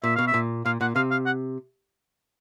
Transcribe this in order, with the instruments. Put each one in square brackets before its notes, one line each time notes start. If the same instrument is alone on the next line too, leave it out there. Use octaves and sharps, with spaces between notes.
[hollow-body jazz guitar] A#2 [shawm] E5
[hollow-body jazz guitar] B2 [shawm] F5
[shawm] E5
[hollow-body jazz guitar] A#2
[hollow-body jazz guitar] A#2 [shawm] F5
[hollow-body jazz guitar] A#2 [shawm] F#5
[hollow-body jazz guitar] C3 [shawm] F5
[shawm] F5
F#5